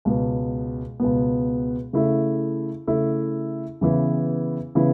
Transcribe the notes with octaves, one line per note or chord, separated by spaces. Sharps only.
C#2 B2 B3
C#2 B2 B3
C#3 A3 E4 A4 E5
C#3 A3 E4 A4 E5
C#3 E3 B3 E4
C#3 E3 B3 E4